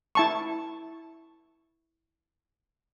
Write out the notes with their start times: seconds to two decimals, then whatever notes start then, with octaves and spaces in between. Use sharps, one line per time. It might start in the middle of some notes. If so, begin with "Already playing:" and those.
0.15 E4 A5 C#6